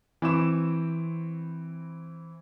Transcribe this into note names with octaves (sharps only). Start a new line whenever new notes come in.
E3 C4 E4 C#6 D6 E7